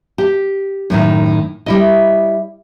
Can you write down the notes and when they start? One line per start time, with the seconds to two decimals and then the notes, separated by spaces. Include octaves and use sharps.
0.18 G4
0.90 F#2 A2 D#3
1.66 G3 E4 D#5